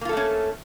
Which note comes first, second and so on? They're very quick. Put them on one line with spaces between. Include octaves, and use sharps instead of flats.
A#3 F4 A4 A3 C#4